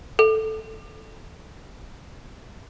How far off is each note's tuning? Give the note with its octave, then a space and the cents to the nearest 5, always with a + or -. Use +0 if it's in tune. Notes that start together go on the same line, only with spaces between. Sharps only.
A4 -5